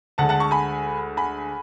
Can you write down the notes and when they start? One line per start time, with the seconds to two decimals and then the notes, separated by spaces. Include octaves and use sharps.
0.18 D2 D3 G#3 F#5 A5
0.29 F#5 A5
0.40 A5 C#6
0.51 G#5 B5
1.17 G#5 B5